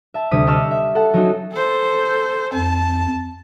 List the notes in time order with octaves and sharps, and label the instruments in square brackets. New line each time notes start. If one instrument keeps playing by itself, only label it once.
[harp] E5 A5
D2 C3 G3 D#6 B6 D#7
G4 D#5 A5 C#6 E6 F6
E5
A4 F#5 A5
F#3 C#4 D#4 F#4
[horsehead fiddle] A4 C5
[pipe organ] F2 [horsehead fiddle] A5